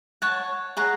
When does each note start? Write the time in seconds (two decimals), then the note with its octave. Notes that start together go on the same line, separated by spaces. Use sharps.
0.22 C#5 F#5 A5
0.77 G#4 C#5 F#5 A#5